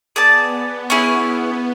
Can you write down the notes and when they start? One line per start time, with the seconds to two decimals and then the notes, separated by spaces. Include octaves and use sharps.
0.16 B3 G#4 D5 A5
0.54 B3
0.90 B3 C#4 E4 G#4